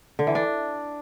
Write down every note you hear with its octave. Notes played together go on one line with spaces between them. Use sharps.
D3
E3
D4